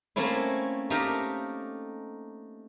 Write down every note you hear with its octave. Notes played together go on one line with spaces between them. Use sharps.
A3 A#3 C4 C#4 E4
A3 A#3 D#4 G4 A#4 G5